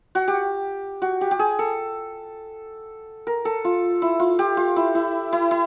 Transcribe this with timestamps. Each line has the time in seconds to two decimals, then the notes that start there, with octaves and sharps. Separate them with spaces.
0.15 F#4
0.28 G4
1.02 F#4
1.21 G4
1.31 G4
1.39 G#4
1.59 A4
3.27 A#4
3.45 A4
3.65 F4
4.02 E4
4.20 F4
4.39 G4
4.57 F4
4.76 E4
4.95 E4
5.33 E4
5.51 E4